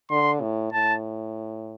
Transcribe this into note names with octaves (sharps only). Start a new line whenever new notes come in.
D3 C6
A2
A2 A5